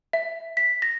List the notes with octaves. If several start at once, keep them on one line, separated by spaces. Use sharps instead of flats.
E5
B6
A#6